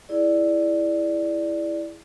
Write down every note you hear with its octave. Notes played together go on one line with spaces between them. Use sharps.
E4 G#4 D5